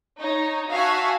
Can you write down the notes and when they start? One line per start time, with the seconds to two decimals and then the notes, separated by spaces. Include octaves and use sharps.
0.19 D#4 C#5
0.70 F#4 E5 F5 G#5 A5